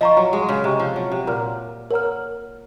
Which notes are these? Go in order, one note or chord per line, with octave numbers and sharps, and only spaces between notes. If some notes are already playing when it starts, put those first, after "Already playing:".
F3 D#5 A#5 C#6
F#3
G#3
C#3
C3 D#5 A#5 C#6
F3
F#3
C3
A#2 A#4 C#5 F#5 A#5 F6
A#4 C#5 F#5 A#5 F6